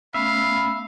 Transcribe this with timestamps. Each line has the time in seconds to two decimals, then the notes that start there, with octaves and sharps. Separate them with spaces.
0.14 A3 B3 C#4 E5 F5 B5